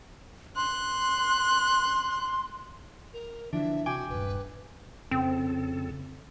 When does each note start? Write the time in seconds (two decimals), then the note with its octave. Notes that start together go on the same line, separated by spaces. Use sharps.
0.56 C6 F#6
3.13 A#4
3.53 D3 E3 F3 D4 E5
3.86 C3 F#4 G5 G#5 D6
4.10 D#1 G2 B4
5.11 F2 C#3 C4 A4